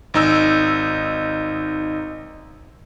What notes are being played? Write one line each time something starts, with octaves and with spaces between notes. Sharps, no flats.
G#1 D#4 E6